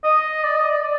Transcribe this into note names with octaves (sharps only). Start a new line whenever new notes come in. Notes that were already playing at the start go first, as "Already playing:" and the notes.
D#5
D5
D#5
D5
D5